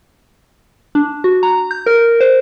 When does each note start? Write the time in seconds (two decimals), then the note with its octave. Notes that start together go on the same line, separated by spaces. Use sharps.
0.95 D4
1.24 F#4
1.43 A#5
1.71 G6
1.86 A#4
2.21 C5